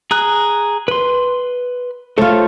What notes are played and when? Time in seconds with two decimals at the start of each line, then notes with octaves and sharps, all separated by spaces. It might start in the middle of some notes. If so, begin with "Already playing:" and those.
0.11 G#4 A#5 F#6
0.88 B4 C6
2.18 A3 F4 A4 C5 C#5